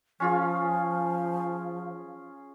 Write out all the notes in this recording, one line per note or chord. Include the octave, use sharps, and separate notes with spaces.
F3 C#4 F4 G#4